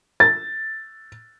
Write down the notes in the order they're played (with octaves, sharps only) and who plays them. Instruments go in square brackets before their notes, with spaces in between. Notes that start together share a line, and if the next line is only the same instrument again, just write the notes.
[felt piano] A6